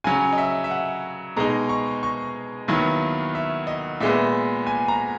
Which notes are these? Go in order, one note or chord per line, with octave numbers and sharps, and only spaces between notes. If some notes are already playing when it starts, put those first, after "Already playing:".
C#3 F#3 C#4 G#5
D#5
E5
E5
F#5
B2 G#3 D#4 A#5
C#6
C#6
D#2 D#3 F#3 B3 E4
E5
D#5
A#2 G#3 B3 E5
G#5
A#5